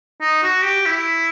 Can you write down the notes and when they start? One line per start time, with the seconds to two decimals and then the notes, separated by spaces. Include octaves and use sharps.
0.21 D#4
0.43 F#4
0.64 G4
0.86 E4